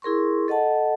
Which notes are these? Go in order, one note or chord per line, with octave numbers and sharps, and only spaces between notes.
E4 G#4 A#4 C6 C#6
A4 D#5 F#5 A5